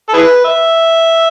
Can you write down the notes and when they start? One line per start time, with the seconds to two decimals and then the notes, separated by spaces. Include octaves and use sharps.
0.09 A4
0.14 E4 G#4 B4
0.44 E5